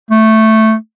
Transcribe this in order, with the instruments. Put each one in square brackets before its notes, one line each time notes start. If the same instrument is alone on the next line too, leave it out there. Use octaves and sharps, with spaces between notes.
[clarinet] A3